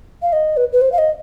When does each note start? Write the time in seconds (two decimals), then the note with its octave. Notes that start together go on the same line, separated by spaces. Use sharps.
0.22 F5
0.33 D#5
0.57 B4
0.73 B4
0.81 C5
0.92 F5
0.98 D#5